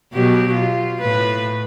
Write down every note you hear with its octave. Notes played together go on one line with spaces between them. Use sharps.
B2 F#3 G4
F4
A2 B4